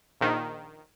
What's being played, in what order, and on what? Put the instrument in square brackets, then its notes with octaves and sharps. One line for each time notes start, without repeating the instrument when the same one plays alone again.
[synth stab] A#1 D#3